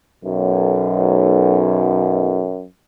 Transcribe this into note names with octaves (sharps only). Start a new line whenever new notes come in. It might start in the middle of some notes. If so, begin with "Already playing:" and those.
B1 F#2